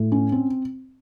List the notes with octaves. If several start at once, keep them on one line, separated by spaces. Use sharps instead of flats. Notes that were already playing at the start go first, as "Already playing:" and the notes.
Already playing: A2
C#4
C4